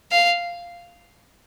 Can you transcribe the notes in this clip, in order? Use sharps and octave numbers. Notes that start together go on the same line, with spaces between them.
F5